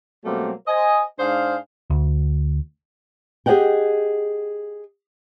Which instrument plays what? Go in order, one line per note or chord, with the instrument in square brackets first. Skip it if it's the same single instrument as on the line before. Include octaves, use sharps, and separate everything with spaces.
[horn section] B2 F#3 G3 A3 A#3 C4
C5 D#5 G#5
G#2 D4 G#4 C5 F5
[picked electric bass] D2
[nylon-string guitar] G4 G#4 C#5 D#5 F#5 G5